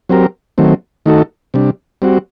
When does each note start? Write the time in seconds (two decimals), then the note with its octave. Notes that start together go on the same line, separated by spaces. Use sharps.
0.09 F#3 C4 G4 A#4
0.58 D#3 F#3 A3 C4
1.06 D#3 A3 D#4 F#4 A4
1.54 C3 G3 D4
2.02 G3 C4 F#4